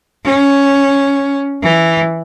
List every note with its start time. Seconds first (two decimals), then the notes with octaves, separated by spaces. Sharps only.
0.25 C#4
1.62 E3